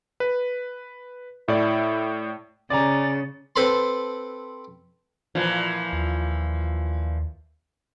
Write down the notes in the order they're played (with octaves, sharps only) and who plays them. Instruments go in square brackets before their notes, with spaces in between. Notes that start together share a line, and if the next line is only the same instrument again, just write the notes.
[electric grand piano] B4
[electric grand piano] A2 D5 [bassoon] E4
[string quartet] C#3 [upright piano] D5 G#5 A#5 [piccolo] A6
[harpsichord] C4 A4 B4 A5 B5 C6
[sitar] A#2 E3 F3
[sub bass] D#2